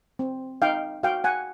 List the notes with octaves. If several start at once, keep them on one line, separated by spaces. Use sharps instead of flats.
C4
D#4 F5 G5
F#4 F5 G5
F#5 G#5